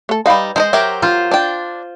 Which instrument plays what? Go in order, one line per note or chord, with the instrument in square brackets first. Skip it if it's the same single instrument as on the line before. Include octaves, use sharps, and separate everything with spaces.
[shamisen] A3 A4
[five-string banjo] G3 D#4 [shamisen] B4 F5 B5
[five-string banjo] G#3 A#4 D#5 [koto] C5
[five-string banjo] F#3 G4 A#4 [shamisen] E5
[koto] F4 C5
[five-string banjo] D4 G5